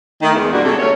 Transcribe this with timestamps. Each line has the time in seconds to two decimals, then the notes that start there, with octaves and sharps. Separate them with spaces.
0.23 D#3 A3
0.35 E2 G#3
0.52 G2 A#2 G3 A#3 D4 F#4
0.64 C3 F#3 G#3 A3 A4
0.79 D#2 C3 A3 C#4 C#5